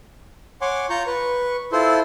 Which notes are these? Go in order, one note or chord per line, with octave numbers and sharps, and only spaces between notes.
C#5 F#5 G#5 C6 D6
F4 A#5 C#6 G6
B4 C#6
E4 F4 A4 C5 C6